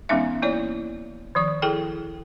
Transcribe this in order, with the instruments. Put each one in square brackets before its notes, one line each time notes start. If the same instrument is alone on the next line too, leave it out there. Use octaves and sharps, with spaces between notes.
[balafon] E3 G#3 B3 C#4 D#4 E5
A#3 E4 C#5 D5
D#3 F3 C#6
E4 G#4 A4 G5